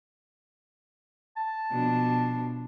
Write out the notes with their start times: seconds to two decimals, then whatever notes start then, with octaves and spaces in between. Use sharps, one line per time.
1.37 A5
1.70 B2 F3 D4